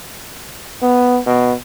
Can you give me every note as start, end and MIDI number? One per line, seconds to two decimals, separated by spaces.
0.82 1.19 59
1.27 1.53 47